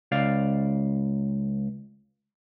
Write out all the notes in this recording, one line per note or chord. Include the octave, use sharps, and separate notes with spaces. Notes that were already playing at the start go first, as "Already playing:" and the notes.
C#2 D5 F5